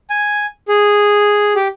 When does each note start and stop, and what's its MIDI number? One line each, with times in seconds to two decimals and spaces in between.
0.10 0.46 80
0.68 1.53 68
1.55 1.68 67